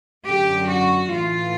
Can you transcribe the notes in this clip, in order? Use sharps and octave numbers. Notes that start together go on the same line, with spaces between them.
F#2 D3 F#3 G4
F#4
A2 E3 F4